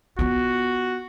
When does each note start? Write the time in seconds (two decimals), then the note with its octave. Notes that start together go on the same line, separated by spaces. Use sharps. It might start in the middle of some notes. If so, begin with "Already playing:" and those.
0.19 B3 F4 F#4